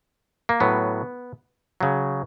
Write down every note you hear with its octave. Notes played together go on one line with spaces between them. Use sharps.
A#3
A2 F#3 B3
C#3 F#3